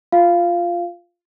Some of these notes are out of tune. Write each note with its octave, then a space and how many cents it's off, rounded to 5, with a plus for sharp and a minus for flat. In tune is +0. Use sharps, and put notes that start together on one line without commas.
F4 +0 F5 -15